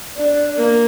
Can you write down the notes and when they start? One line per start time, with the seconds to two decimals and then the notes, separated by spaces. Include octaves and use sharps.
0.17 D4 D5
0.57 A#3 A#4